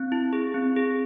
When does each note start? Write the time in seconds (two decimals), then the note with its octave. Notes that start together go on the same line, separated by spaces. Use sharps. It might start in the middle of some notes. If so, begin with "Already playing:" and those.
Already playing: C4
0.12 E4
0.33 G#4
0.54 C4
0.76 G#4